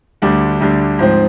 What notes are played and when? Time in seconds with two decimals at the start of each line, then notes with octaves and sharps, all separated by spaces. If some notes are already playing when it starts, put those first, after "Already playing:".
0.22 D2 D3 G3 D4
0.60 D2 D3 G3 D4
0.99 G#2 F3 C4